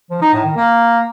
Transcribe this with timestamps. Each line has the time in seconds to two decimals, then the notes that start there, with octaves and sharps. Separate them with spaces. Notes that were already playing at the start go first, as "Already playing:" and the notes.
0.11 F3
0.22 D#4
0.33 A2
0.45 D#3
0.56 A#3